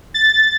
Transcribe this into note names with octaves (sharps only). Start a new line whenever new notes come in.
A6